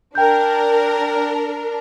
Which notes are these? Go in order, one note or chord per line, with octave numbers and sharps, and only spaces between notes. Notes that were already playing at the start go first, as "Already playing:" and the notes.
D4 A#4 G5 G6